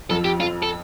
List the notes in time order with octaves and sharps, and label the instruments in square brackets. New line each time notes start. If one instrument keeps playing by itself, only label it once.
[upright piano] F2 F3 [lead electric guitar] A4
[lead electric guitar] G4
[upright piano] F2 F3 [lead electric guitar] F4
[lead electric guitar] A4